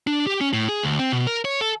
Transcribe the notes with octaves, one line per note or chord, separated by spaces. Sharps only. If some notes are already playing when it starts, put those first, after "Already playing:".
D4
G4
C#4
A2
G#4
D2
C4
B2
A#4
C#5
A4